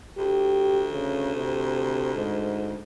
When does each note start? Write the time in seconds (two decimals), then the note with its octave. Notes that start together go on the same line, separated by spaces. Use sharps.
0.18 D2 G4
0.92 C#3
1.35 C3
2.16 G#2